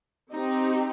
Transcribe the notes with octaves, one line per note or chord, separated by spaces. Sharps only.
C4 D#4 G4